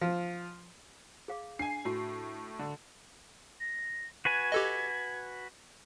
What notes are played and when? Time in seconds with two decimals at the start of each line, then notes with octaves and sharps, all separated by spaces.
0.01 F3
1.28 G#4 F5 D6
1.59 D4 G#5 C7
1.85 A2 F#4
2.59 D3
3.60 A#6
4.25 F#4 B4 G#5 G#6
4.52 G4 A4 D#5